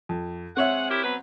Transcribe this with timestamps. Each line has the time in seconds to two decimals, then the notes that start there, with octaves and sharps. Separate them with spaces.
0.09 F2
0.57 G#3 C4 C#5 E5 F#5
0.89 E4 G4 A#4
1.04 F#3 B3 B4